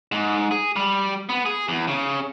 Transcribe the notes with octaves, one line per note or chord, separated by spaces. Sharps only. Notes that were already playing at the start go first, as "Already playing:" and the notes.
G#2
G#4
G3
B3
G#4
E2
C#3